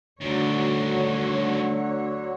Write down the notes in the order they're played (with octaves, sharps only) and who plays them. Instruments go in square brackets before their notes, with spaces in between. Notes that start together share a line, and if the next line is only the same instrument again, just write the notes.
[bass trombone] D2 [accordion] D3 F#3 [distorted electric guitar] D#3 G3 [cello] C#5